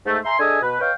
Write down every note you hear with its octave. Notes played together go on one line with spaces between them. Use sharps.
G#2 A3
E5 G#5 A#5 C6
D4 G#4 A4 D#5 E5 G#5
B2 B4
B4 C#5 D#5 F5 G5